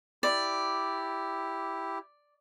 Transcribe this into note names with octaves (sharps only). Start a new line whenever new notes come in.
E4 G4 D5